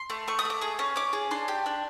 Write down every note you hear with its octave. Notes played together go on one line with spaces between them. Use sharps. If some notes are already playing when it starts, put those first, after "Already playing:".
Already playing: C6
A3
A3 C#6
D#6
A3 D6
G#4 D#6
C#4
C#4 D6
G#4
D4 C6
G4
D4